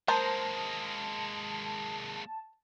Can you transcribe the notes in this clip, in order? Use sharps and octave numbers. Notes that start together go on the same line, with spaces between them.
G#3 A#3 A#4 C5 A5